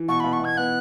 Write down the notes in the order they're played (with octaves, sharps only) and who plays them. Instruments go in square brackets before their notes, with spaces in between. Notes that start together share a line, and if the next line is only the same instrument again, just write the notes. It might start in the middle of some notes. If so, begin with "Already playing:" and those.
Already playing: [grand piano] E3
[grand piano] B2 [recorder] C#6
[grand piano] B2 [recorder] B5
[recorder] C#6
[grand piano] B2 [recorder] G#6
[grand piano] B3 [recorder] F#6